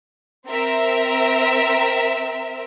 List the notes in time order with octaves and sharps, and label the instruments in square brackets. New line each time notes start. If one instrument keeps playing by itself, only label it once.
[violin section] C4 A#4 E5